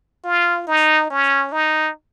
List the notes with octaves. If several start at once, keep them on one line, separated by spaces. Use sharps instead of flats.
F4
D#4
C#4
D#4